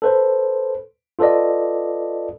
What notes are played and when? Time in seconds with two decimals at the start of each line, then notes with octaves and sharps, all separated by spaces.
0.02 A4 B4 C5
1.19 F4 A4 B4 D5 D#5